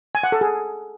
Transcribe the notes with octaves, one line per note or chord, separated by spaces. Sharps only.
G#5
F#5
A4
G#4